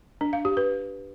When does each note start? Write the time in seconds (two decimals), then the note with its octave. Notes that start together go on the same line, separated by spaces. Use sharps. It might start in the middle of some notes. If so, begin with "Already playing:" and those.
0.21 D4
0.33 F5
0.45 G4
0.57 B4